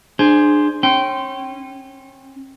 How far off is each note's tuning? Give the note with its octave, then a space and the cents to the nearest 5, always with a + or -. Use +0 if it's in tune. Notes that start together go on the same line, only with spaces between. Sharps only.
D4 +25 G#4 +5 C5 +0
C#4 -35 G5 -15 C6 -15